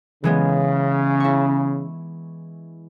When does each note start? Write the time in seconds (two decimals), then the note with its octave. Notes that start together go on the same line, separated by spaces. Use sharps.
0.24 C#3 E3 G#3 B3
1.20 E4 C#6